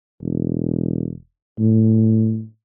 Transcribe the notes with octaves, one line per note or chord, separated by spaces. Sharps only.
E1
A2